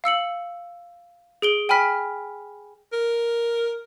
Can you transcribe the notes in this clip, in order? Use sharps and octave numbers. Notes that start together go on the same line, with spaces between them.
F5 E6 C#7 F#7
G#4 D7 G7
G5 G#5 B5 F6 B6
A#4